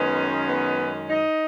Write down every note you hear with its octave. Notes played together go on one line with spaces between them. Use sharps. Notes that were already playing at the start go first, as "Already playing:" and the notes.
Already playing: F#2 D#3 G#3 B3 C#4 B4
B3 B4
D#4 D#5